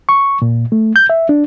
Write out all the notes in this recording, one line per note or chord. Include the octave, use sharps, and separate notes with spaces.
C#6
A#2
A3
G6
E5
D4